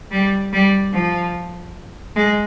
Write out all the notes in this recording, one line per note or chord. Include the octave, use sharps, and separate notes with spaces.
G3
G3
F3
G#3